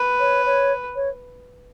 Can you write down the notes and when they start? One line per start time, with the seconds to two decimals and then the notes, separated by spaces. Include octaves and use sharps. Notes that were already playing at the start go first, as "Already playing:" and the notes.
Already playing: B4
0.19 C#5
0.46 C#5
0.96 C#5